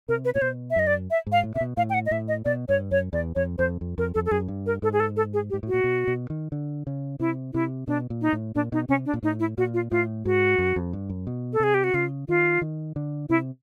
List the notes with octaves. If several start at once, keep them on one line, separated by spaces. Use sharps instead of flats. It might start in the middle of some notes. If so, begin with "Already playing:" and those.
C3 A#4
B4
A#2 C#5
B2 C5
E5
F#2 D#5
D5
E5
G#2
F5
A2
C3 E5
B2
A2 F5
G5
F#5
D#5
A2 E5
D#5
B2 D5
G2 C#5
F#2 C#5
E2 D5
F2 C#5
F2 C5
F2
F2 A#4
F2 A4
A4
F#2 G#4
G2
A#4
G#2 A4
G#4
A4
A4
G#4
G4
G#2
A2 F#4
A#2
B2
B2
D#3
D3
C#3
C3 E4
C3 E4
B2 D4
A#2
D#4
A2
A#2 D4
B2 D#4
C3 C#4
D4
A#2
A2 D#4
E4
A#2 F#4
F4
A2 F4
G#2 F#4
F#2
F2
G2
F#2
B2
A4
C3 G#4
G4
F#4
C#3 F4
D#3 F4
D#3
D3
C3 E4